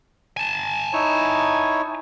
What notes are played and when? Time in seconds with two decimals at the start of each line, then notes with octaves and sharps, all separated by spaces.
0.37 G#5 A5
0.93 D#4 E4 C#5